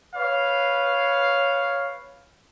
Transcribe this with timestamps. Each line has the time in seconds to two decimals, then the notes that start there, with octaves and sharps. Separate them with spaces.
0.15 B4 C#5 F5